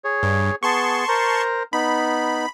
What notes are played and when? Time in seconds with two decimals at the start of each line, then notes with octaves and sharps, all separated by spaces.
0.04 G#4 C#5
0.23 G2
0.63 B3 G#4 A5 C6 C#6
1.08 A#4 C5 A#5
1.73 B3 D#4 B5